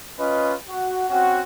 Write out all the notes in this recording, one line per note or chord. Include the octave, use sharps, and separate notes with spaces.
C#4 F4 B4 D#5
F#4
C4 C#4 F#4